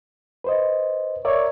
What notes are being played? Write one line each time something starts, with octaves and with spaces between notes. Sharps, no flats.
B4 C5 D#5
A#4 C#5 D5 E5